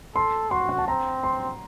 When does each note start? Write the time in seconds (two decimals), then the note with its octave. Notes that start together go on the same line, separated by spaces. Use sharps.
0.15 A4 C6
0.51 F#4 C6
0.69 F#5
0.78 A5
0.87 C4 A#5
1.24 C6